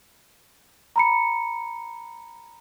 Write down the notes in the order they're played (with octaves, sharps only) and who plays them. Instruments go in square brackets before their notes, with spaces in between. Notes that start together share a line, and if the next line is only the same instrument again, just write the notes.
[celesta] A#5 B5 C#7